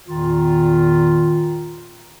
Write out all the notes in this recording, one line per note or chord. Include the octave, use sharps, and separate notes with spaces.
E2 A#2 D#3 F4